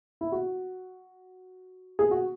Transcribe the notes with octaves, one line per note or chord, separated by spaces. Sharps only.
E4
F#4
G#4
F#4